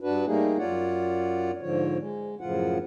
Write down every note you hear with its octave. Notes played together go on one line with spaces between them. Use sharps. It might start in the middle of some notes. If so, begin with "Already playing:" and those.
G2 D4 F#4 B4
G3 A3 A#3 D#4 G#4
F#2 F4 C#5 D5 F#5
G#2 D3 F3 C#5
G#3
F#2 A2 C#3 F3 F4 F#5